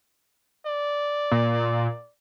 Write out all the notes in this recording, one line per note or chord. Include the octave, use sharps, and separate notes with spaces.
D5
A#2